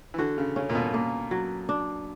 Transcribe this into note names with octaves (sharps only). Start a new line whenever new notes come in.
E3
D3 F#4
C#3
C#3 C#4
A#2
B2
A#3
F#3
D4